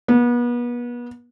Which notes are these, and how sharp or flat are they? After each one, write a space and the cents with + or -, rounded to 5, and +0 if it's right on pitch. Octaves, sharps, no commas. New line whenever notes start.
B3 -35